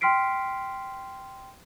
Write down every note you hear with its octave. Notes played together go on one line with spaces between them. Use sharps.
G5 C6 F6 B6 C7 D7